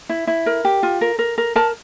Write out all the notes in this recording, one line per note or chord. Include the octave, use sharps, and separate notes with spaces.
E4
E4
A#4
G4
F4
A#4
A#4
A#4
A#4 A5